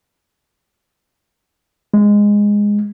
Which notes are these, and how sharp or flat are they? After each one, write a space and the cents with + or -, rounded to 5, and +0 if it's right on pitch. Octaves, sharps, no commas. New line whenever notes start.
G#3 -10